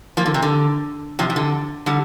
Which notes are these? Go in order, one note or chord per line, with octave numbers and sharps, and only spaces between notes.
F3 A#3
D3
C3
D3
C3 F3
C3
D3
D3 G3